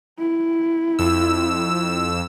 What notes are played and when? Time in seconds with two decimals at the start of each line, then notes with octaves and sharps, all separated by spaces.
0.19 E4
0.99 F2 E6